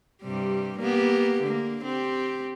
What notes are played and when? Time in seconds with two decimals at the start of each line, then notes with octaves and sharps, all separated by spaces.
0.22 G2 C3 G3
0.78 A#3 B3 G4
1.42 D3 A#3
1.82 C4 G4